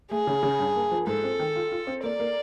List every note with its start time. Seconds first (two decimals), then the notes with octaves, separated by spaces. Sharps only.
0.11 A3 G#4
0.27 C#3
0.43 C#3
0.59 G2
0.76 A#3
0.91 F3
1.07 G#2 A4
1.24 C4
1.39 D#3
1.56 F4
1.72 F4
1.87 C4
2.04 A#3 D5
2.20 A#3